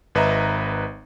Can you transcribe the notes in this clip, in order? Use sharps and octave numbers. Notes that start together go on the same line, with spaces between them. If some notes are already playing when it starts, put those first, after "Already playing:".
G#1 B4 D#5 E5 A#5